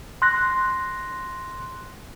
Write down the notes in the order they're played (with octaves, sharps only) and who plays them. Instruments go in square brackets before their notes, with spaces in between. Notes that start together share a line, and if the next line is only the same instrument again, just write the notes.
[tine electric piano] C6 F#6 A#6